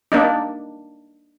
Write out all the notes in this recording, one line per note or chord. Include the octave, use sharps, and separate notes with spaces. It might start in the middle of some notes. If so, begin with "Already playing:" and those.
A#3 D4 D#4